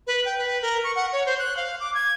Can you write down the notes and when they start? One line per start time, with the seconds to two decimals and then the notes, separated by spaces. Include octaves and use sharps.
0.07 B4
0.25 G5
0.38 B4
0.62 A#4
0.84 C#6
0.96 F#5
1.13 C#5
1.26 C5
1.39 F#6
1.57 F5
1.80 D6
1.94 G#6